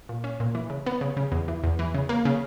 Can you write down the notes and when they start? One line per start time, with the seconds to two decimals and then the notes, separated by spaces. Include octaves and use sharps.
0.09 A#2
0.24 C#4
0.40 A#2
0.55 E3
0.70 C#3
0.86 B3
1.01 C#3
1.17 C#3
1.32 E2
1.48 E3
1.63 E2
1.79 E3
1.94 C#3
2.09 A#3
2.25 C#3